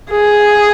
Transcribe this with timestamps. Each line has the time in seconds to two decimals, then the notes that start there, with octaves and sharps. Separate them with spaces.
0.11 G#4